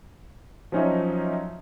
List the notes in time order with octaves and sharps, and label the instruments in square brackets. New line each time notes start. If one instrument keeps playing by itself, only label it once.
[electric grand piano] F3 F#3 C#4 D#4 C#5 E5